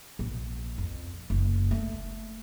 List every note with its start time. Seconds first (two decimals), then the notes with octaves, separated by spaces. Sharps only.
0.19 A#1
0.78 F2
1.30 F#1
1.71 A3